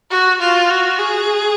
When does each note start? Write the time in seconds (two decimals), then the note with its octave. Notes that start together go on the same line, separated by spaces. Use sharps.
0.11 F#4
0.41 F4
0.70 F#4
0.99 G#4